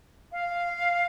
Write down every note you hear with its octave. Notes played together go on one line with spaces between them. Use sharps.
F5